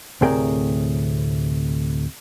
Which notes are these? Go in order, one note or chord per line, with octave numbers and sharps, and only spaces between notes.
D2 A2 C3 G#4 A#4 G5